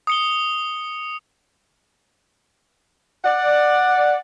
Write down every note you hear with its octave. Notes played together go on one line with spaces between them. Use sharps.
D#6 C#7 G7
D5 F#5